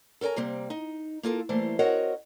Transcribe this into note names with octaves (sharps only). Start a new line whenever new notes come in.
A4 A#4 C#5 G#5 A#5
C3 G3 A#3 C4
D#4
A#3 F4 A4 A#4
E3 G3 A3 A#3 C5
C4 F#4 A#4 C#5 D#5 F#5